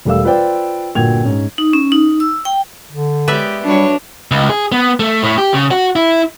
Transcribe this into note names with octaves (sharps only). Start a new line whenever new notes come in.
E1 G3 A3 A#4 F5 E6
F4 B4 C5 D5 G5
G1 A#2 F#4 G5 G#6 F7
G#2 C#4
D#4
C#4
D#4
E6
G5
D3
G#3 B3 G4 B4 D5 E5
F#3 G3 D4 C#5
C#2
G#4
B3
A3
A2
G4
C#3
F#4
E4